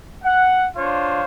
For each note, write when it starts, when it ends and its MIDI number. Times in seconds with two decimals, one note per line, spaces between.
0.24 0.66 78
0.76 1.25 62
0.76 1.25 65
0.76 1.25 72
0.76 1.25 73
0.76 1.25 77